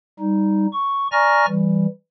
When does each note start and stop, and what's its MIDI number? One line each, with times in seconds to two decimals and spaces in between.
0.20 0.67 55
0.20 0.67 63
0.72 1.07 85
1.12 1.46 74
1.12 1.46 80
1.12 1.46 82
1.12 1.46 85
1.12 1.46 89
1.12 1.46 94
1.48 1.87 52
1.48 1.87 55